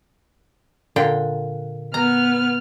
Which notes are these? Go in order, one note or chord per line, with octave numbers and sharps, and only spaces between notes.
A#2 D3 G5
B3 A#5 F6